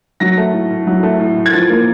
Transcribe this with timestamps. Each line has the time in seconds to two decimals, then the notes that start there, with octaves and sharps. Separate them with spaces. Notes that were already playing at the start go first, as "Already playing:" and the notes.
0.20 F#3 A#6
0.37 A3
0.53 A2
0.70 A2
0.87 F#3
1.03 A3
1.20 A2
1.36 A2
1.46 G#6
1.53 F3 A6
1.69 A#3